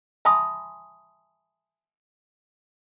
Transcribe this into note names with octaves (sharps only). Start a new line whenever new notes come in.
E5 G#5 A5 B5 C6 D#6